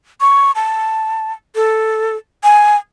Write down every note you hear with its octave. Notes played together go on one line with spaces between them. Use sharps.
C#6
A5
A4
G#5